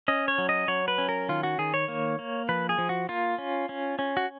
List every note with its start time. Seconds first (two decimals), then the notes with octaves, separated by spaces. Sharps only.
0.08 C#4 D#5
0.28 C#5
0.38 F#3
0.49 D#5
0.68 F#3 C#5
0.88 B4
0.98 C#4
1.09 A#4
1.29 D#3 F4
1.43 F#4
1.58 D#3 G#4
1.74 C#5
1.88 A#3
2.19 A#3
2.49 F3 B4
2.69 G#4
2.78 F3
2.89 F#4
3.09 A#3 F4
3.38 C#4
3.69 C#4
3.99 C#4
4.17 F#4